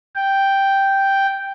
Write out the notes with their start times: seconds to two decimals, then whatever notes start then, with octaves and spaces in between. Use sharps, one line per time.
0.15 G5